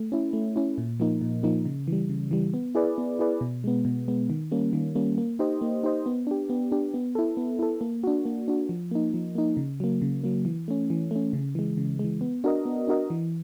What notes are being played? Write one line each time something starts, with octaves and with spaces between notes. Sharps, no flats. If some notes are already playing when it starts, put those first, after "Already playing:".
Already playing: A3
C#4 E4
A3
C#4 E4
A#2
F3 A#3 D#4
A#2
F3 A#3 D#4
C#3
E3 G3
C#3
E3 G3
B3
E4 G#4 B4 D5
B3
E4 G#4 B4 D5
B2
G#3 B3
B2
G#3 B3
D#3
G3 A#3 C#4
D#3
G3 A#3 C#4
A#3
D#4 G4 C5 D#5
A#3
D#4 G4 C5 D#5
B3
D4 G4
B3
D4 G4
B3
E4 A4
B3
E4 A4
A#3
D4 F#4
A#3
D4 F#4
F3
A#3 D#4
F3
A#3 D#4
C#3
F#3 A#3
C#3
F#3 A#3
E3
A3 C#4
E3
A3 C#4
C#3
E3 G#3
C#3
E3 G#3
B3
D4 F#4 A#4 D#5
B3
D4 F#4 A#4 D#5
E3